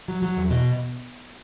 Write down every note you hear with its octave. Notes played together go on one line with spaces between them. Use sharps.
F#3
F#3
E2
B2